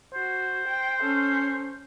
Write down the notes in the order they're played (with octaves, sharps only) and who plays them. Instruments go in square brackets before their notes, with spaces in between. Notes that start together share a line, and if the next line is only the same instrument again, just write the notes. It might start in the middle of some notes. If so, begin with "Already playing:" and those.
[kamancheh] F#4 [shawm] C5
[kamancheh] G5
C#4 A4